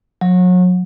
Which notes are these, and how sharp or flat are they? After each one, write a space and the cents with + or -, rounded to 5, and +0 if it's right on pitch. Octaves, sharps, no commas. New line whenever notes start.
F#3 -35